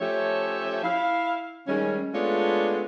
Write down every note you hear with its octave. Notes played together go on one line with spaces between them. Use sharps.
F3 A3 C#4 G4 C#5 E5
E4 F5
D#3 G3 G#3 C#4
G#3 A3 B3 D4 F4 C#5